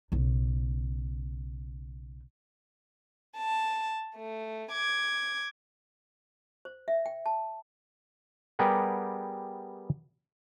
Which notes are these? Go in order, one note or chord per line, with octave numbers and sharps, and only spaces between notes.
B1 C#3
A5
A3
D6 G#6
C5
E5
G5
A5
G3 B3 G4 G#4 A#4 F#5